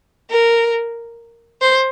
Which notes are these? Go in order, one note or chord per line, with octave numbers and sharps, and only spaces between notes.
A#4
C5